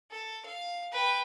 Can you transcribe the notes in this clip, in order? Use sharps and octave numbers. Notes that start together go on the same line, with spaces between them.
A4
F5
B4 G5